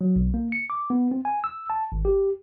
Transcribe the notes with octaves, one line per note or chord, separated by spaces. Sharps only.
F#3
B1
A#3
C#7
D6
B3
C4
G#5
E6
A5
G#1
G4